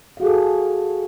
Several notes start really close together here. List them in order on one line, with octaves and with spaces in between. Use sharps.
F5 F#4 G#4 A4